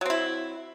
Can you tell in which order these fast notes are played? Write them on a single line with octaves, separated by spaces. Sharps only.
F#3 C4 E4